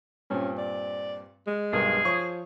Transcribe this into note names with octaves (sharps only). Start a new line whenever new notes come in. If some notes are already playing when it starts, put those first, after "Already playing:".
G2 A#2 C4 C#4
D5
G#3
B1 G2 G#4 A#4
F3 C#5 C#6 D#6